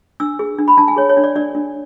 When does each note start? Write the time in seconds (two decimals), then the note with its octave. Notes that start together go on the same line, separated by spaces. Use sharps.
0.20 D4 E6
0.39 G#4
0.59 D4
0.68 B5
0.77 D4 A5
0.88 G#5
0.97 G#4 C#5
1.09 C#5
1.17 D4
1.24 D5
1.35 D4 D5
1.55 D4